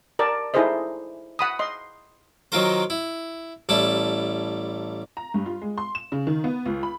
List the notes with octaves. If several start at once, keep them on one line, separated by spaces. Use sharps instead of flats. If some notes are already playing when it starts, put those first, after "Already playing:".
A#4 D5 A5
D#4 E4 G#4 A4 C5 D#5
F#5 B5 D#6
D#5 C6
D#3 F#3 C4 F4 A#4 C5
E4
A1 G3 E4 A5
A#5
G2
F4
G#3
C6
E7
C#3
D#3
B3
C#2
B5